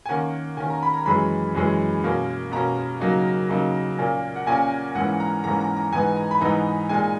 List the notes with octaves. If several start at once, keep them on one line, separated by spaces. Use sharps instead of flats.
G#5
D#3 A#3 C#4 F#5
D#3 A#3 C#4 G#5
A#5
B5
A#5
F#2 E3 G#3 C#4 B5
F#2 E3 G#3 C#4
B2 A#3 C#4
B2 A#3 C#4 A#5
C#3 F#3 A#3 D#4
C#3 F#3 A#3 D#4
A#2 A#3 C#4
F#5
A#2 A#3 C#4 G#5
G#2 E3 A#3 C#4 F#5
A#5
G#2 E3 A#3 C#4 A#5
A#5
A#5
G#2 E3 B3 D#4 G#5
A#5
B5
G#2 E3 B3 D#4 A#5
A#2 G#3 D#4 G#5